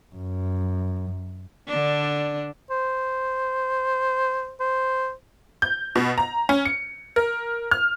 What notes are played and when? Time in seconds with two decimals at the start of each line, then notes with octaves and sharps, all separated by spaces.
0.16 F#2
1.68 D3 D4
2.71 C5
4.60 C5
5.62 G6
5.96 B2
6.18 A#5
6.49 C#4
6.65 C#7
7.16 A#4
7.71 F6